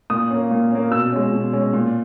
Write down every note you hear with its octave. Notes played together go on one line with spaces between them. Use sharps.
A#2 D#6
A#3 C#4
A#2
A#3 C#4
B2 E6
G#3 C#4
B2
G#3 C#4
A#2